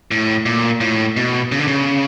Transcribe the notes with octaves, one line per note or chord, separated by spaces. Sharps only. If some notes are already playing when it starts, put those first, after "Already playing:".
A2
A#2
A2
B2
C#3
D3
C#3